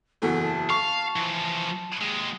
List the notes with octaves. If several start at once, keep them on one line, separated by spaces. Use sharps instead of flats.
F#1 E2 F#4 A4
A5
F5 C#6
E3 F3
D#2 G#3